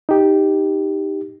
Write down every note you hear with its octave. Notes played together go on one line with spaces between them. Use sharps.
D#4 G4